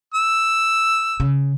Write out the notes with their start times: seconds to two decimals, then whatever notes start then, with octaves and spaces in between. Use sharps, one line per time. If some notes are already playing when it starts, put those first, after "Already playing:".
0.15 E6
1.20 C#3